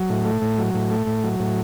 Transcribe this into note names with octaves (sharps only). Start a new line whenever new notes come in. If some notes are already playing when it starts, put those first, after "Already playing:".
Already playing: F#3
A2
A3
A2
F#3
A2
A3
A2
F#3
A2